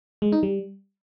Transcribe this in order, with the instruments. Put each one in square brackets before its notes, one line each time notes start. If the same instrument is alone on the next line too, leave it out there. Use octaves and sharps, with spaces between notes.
[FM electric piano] G#3
D#4
G3